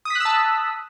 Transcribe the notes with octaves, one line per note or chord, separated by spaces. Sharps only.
A5 D#6 E6 F#6 B6